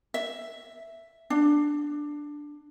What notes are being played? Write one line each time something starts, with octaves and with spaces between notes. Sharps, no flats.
E5
D4